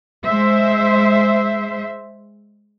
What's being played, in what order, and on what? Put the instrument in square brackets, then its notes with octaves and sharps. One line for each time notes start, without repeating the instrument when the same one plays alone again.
[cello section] G#3 C5 E5